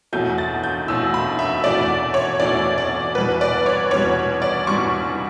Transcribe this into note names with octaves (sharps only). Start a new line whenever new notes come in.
E2 B2 F#3 A3 G6
A6
G6
E2 B2 F#3 A3 E6
B5
E5
E2 B2 F#3 A3 D5
C#5
E2 B2 F#3 A3 D5
D5
E2 B2 G3 B4
D5
C#5
E2 B2 G3 C#5
D5
E2 B2 G3 C#6